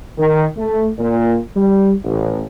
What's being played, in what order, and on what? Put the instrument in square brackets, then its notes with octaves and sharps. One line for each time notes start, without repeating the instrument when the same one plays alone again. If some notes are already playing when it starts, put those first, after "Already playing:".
[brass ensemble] D#3
A3
A#2
G3
A1